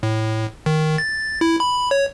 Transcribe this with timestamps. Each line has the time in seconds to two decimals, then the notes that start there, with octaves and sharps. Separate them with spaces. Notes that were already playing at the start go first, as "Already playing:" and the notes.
0.03 A2
0.66 D#3
0.98 A6
1.41 E4
1.60 B5
1.91 C#5